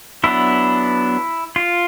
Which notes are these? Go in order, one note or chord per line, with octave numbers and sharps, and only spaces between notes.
F#3 B3 D4 E4
F4